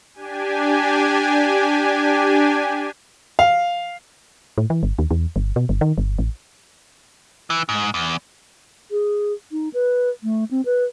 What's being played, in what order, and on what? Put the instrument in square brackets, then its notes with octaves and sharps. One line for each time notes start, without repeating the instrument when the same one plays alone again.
[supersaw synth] D4 G4 G#5
[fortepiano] F5
[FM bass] A2
E3
G1
D#2
E2
G1
B2
G1
D#3
G1
A1
[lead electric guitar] E3
G#2
E2
[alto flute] G#4
D#4
B4
A3
C4
B4